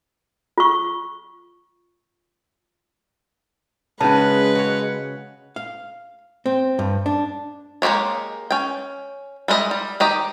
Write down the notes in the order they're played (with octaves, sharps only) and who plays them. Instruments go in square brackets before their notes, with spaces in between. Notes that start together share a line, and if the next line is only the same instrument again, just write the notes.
[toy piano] F4 C#6
[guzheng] C#3 F#4 [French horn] G#3 [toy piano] C#4 A5 [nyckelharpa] B4
[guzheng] F#4 C#5
[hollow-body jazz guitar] F5
C4
G2
D4
[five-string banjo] G#3 A#3 C4 G4 C#5
C#4 G5
G3 G#3 B3 D#5 E5
G3
D#3 G4 D#5 A#5